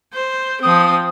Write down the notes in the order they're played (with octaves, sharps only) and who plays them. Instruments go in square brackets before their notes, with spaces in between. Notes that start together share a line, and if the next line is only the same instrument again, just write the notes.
[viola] C5
[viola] F3 C4 [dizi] D#6